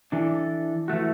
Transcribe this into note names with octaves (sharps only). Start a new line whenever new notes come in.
E3 D4 A4
E3 A3 F#4